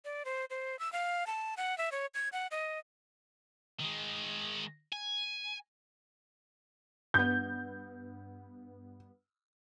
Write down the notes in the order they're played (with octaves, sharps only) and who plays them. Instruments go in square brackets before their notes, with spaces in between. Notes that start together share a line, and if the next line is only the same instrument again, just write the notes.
[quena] D5
C5
C5
E6
F5
A5
F#5
E5
C#5
G#6
F#5
D#5
[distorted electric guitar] D#3 G#3
G#5
[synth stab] G2 B3 [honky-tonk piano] G6